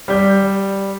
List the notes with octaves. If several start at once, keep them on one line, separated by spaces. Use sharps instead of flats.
G3 G6